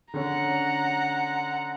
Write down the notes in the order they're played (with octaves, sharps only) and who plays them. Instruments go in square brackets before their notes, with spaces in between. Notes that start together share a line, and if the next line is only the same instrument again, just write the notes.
[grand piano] D3 C#4 [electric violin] F#5 A#5